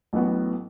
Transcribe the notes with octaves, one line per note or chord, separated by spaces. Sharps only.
A1 A2 F#3 B3 F#4